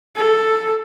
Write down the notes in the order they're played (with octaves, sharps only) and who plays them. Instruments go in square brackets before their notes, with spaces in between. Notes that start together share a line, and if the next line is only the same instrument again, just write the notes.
[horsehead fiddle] A4